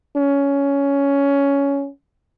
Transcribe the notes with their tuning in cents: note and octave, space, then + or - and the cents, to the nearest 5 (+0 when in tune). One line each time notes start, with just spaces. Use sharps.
C#4 +10